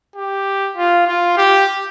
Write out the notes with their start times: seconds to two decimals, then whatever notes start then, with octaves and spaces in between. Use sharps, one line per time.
0.16 G4
0.77 F4
1.07 F4
1.37 G4